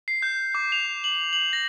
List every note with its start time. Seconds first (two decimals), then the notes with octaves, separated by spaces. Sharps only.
0.08 C7
0.22 G6
0.55 D6
0.72 F7
1.04 F#7
1.33 F#7
1.53 A#6